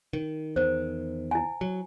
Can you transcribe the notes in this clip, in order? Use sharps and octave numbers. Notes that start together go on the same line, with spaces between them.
D#3
E2 D#3 C5
E4 G#5
F#3